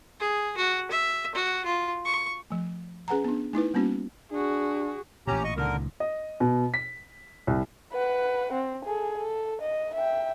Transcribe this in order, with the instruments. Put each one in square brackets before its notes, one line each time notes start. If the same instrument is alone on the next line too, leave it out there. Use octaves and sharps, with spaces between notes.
[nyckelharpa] G#4
F#4
E5
F#4
F4
C#6
[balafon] F3 A3
C#4 G#4 B4 F#5 G#5 A#5
B3 D4
A3 D#4 E4 B4
G3 A#3 B3 C#4 F#4
[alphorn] D4 [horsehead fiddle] F#4 G#4
[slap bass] A1 A#2 [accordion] C#4 G4 A#5
[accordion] D#5 C#6
[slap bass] C#2 A#2 D#3 [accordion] D3 A#4
[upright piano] D#5
B2
B6
C2
[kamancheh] B4 F#5
C4
G#4 A4
A4
D#5
E5 G5